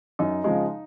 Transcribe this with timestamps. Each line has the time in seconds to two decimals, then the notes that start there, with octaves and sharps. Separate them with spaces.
0.19 F#2 D#4
0.44 C#3 F3 G#3